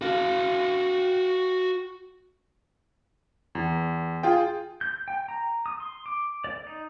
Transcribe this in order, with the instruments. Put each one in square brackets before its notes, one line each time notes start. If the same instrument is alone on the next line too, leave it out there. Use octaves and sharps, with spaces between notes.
[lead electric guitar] F#4 F5
[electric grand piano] E2
F4 G#4 G5
[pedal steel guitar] G6
G5
A#5
D#6
C6
D6
D5
D#4